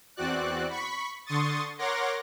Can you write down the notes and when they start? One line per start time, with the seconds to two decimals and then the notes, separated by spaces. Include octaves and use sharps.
0.16 E2 C4 F#4 D5 F#6
0.69 B5 C#6 B6
1.26 D3 C6 C#6 D#6 A6
1.78 A#4 C#5 F#5 C6 D6 A#6